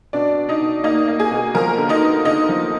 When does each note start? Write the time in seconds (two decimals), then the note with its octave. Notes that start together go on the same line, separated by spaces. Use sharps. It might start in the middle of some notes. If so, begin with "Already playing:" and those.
0.13 B2 D4 D5
0.37 B2
0.49 D#4 D#5
0.61 B2
0.84 A#3 D#4 D#5
1.08 A#3
1.20 G#4 G#5
1.31 B2
1.55 F3 A#4 A#5
1.78 D3
1.89 D#4 D#5
2.01 B3
2.25 D3 D#4 D#5
2.49 F3